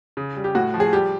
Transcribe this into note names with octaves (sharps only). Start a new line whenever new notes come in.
C#3
G3
G4
A2 F#4
F3
G#4
G3 G4